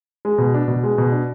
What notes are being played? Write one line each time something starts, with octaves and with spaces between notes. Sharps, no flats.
G#3
B2
D4
B2
G#3
B2
D4